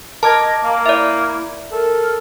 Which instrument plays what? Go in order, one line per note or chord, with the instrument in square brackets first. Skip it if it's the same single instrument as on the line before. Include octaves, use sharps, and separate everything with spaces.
[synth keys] A#4 D6 G#6 [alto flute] D#5 [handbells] A5
[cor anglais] A#3 [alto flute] F5
[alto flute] E4 [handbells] D5 E5
[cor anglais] A4 [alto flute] A#4